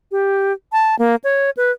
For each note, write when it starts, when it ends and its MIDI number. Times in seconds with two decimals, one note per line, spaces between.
0.12 0.53 67
0.72 0.95 81
0.99 1.16 58
1.24 1.50 73
1.57 1.72 71